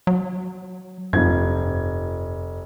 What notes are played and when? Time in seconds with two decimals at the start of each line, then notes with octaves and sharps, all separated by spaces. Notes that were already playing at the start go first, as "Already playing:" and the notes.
0.07 F#3
1.13 F1 G2 F3 G#6